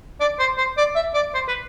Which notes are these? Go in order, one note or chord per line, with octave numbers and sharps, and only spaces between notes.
D5
C5
C5
D5
E5
D5
C5
B4